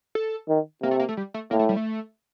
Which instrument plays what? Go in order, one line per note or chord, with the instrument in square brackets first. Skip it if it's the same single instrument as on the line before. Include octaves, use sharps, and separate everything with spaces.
[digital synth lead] A4
[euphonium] D#3
[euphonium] C3 [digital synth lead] A#3
[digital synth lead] A3
A#3
A3
G3
A3
[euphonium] A2 [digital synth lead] A#3
[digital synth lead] A3
G3
A3